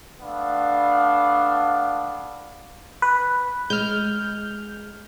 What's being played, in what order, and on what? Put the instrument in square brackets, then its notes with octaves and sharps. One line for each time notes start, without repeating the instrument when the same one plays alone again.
[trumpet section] A3 B3 D4 F5
[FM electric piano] B4
[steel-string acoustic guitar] G#3 [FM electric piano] F6 G6